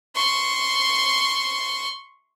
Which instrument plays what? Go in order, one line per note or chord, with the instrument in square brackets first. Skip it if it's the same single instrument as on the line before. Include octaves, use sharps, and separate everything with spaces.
[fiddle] C6 C#6